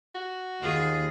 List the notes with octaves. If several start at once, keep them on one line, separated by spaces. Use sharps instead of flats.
F#4
D#2 D#3 F4 G#4